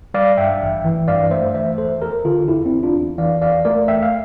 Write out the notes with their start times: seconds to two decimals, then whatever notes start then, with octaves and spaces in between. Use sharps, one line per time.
0.14 G3 D5 F5
0.37 G2 E5 G5
0.62 A1
0.85 E3
1.08 G2 D5 F5
1.31 A3 C5 E5
1.54 E3 C5 E5
1.78 E2 A4 C5
2.01 E2 G4 A#4
2.25 D3 F4 A4
2.48 E2 E4 G4
2.66 C4 E4
2.72 E2
2.83 D4 F4
2.95 E2
3.18 E3 D5 F5
3.41 E2 D5 F5
3.65 A3 A#4 D5
3.88 E2 E5 G5
4.02 F5